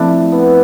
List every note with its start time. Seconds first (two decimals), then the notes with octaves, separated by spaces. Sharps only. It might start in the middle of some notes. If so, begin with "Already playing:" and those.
Already playing: F3 A3 C4 D4 E4 F4 A4
0.32 B3